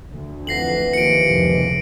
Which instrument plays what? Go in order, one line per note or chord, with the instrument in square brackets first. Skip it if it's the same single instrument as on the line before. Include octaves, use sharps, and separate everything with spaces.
[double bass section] D2
[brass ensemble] F2 F#5 [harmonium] E3 [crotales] A#6 C7 F#7
[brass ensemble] D#2 F3 [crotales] C#7 D7
[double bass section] F1 C#2